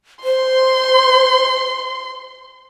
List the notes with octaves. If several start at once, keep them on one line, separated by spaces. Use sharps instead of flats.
C5 C6